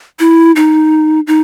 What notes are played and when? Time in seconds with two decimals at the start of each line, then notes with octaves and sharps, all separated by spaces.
0.20 E4
0.56 D#4
1.27 D#4